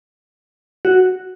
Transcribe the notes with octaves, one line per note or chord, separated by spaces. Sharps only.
F#4